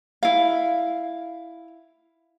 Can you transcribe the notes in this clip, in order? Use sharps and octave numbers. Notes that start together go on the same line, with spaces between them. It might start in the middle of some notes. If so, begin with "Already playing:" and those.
E4 F5